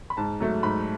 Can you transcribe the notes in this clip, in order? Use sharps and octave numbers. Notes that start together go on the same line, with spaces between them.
B5
G#2 A5
F#3 A3
G#2 B5